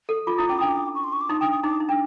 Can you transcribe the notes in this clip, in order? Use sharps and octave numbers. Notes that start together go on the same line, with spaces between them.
A4
F4 D6
E4 D#6
C#4 D6
D4 D#6
D6
C#6
C6
C#6
D6
D#4 D#6
D4 D#6
D#6
D#4 D6
D#4
D4